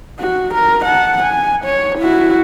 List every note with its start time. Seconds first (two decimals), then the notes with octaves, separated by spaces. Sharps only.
0.20 F#4
0.54 A#4
0.85 F#5 A5
1.23 G#5
1.65 C#5
1.99 E4 F#4